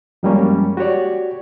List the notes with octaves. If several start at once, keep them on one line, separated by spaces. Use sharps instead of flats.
F#2 F3 G3 G#3 A#3 C#4
F#4 G4 C#5 D5